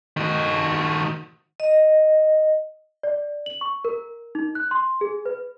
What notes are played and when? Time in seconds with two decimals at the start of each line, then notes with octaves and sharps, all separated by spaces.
0.17 D#3 F#4
1.60 D#5
3.03 D5
3.46 F#7
3.61 C#6
3.85 A#4
4.35 D#4
4.55 F#6
4.71 C6
5.01 G#4
5.26 B4